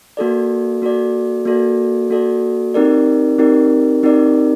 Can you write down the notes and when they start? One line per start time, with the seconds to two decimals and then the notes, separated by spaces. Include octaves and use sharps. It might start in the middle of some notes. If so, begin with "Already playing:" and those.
0.17 A#3 F#4 A4 D5
0.82 A#3 F#4 A4 D5
1.45 A#3 F#4 A4 D5
2.10 A#3 F#4 A4 D5
2.74 C4 D#4 G4 A#4 D5
3.38 C4 D#4 G4 A#4 D5
4.03 C4 D#4 G4 A#4 D5